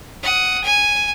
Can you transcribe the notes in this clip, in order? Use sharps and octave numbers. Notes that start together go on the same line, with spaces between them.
F#5 D#6
G#5